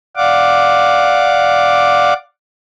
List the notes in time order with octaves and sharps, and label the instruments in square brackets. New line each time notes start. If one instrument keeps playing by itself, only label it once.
[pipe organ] D5 F5 F#5 D6